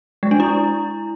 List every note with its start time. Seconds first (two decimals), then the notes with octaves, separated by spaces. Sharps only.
0.23 G#3
0.31 D4
0.40 E4